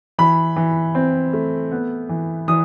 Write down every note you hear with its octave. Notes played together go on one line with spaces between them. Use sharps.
E3 B5
E3
C4
A3
B3
E3
E3 D#6